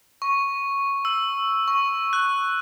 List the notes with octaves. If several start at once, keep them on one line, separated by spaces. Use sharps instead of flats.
C#6
E6
C#6
F#6